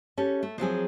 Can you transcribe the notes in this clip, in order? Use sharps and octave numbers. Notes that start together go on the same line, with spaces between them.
C#4 G4 A4
A3
F3 F#3 C4 G#4